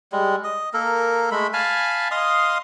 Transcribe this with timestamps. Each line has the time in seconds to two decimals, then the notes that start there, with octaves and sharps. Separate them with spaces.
0.12 G3 G#3
0.44 D#5
0.73 A#3 A4 A#4
1.31 G#3 A3 B5
1.53 F5 G#5 A5 B5
2.11 D#5 F5 C6 D#6